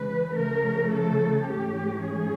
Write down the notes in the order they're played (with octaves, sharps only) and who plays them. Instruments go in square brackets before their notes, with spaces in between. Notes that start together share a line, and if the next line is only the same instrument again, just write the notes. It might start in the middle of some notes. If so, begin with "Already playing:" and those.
Already playing: [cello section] C#3 E3 G#3 B4
C#3 F3 A3 A#4
A4
G#2 E3 A3 C#4 G4
G#4